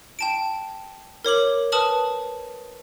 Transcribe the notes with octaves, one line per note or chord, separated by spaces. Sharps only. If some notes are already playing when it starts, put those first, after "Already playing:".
G5 A5 D7
A#4 C#5 D6 F#7
B4 A5 D#6 F6 F#7